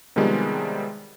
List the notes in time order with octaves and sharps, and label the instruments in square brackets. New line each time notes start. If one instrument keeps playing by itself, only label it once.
[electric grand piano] C3 D#3 F3 G3 G#3 B3